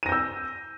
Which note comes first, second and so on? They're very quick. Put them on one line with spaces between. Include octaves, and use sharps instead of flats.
D#7 A#6 G6 E6